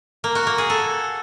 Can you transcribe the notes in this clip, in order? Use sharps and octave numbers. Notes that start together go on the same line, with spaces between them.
A#3
F#4
A#3
G#4
A4